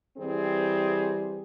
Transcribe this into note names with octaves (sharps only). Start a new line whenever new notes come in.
E3 G3 C4 G#4